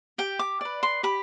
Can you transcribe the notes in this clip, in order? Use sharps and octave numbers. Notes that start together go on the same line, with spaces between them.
G4 G5
D6
B4 D5
C6
G4 B5